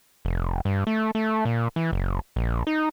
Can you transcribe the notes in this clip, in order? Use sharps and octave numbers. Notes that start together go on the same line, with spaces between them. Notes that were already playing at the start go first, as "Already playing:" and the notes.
F1
G2
A3
A3
A#2
E3
F#1
A#1
D#4